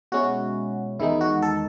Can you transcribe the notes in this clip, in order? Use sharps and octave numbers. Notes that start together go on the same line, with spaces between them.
B2 G#3 C#4 E4 F#4
E2 D#3 G#3 D#4 E4
F#4
A4